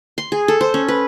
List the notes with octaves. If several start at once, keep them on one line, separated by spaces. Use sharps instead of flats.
C6
G#4
A4
C5
C#4
B4